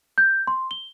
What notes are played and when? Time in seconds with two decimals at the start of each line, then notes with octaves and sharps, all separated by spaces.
0.18 G6
0.47 C6
0.71 G7